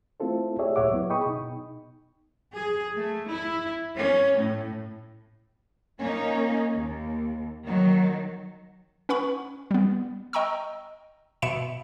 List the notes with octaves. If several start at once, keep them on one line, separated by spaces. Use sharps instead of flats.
A3 C4 E4 F4 A4 C5
G4 G#4 C#5 D5 E5
D2 A#2 C#5 E5 F#5 D6
F#3 B3 E4
G#4 D#5 G5 B5 C#6 D#6
B2 D#4
G#4
A3
E4
C#4
A2
A#3 C#4 D#4
D#2
D#3 F#3
C#4 B4 F#5 B5 C#6
G3 B3
D#5 G5 A#5 C#6 E6
B2 E5 B5 C#7 D7 E7